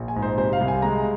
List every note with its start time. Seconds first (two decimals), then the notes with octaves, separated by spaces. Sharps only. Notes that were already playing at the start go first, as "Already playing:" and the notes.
Already playing: A#1
0.08 G#5
0.16 G#2
0.22 C5
0.37 C3 C5
0.53 F5
0.61 C2
0.68 G#5
0.82 G#3 A#5